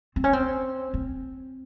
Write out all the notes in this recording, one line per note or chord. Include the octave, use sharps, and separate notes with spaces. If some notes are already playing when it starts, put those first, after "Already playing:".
C4
C#4
C4
C4